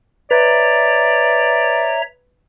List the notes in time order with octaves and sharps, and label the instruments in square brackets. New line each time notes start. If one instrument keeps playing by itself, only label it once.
[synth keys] B4 [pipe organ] C#5 E5 A#5 [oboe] D5